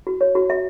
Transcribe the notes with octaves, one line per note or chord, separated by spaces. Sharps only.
F#4
C#5
F#4
E5